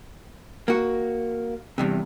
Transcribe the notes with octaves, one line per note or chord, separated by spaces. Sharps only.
A#3 F#4
E2 G2 C3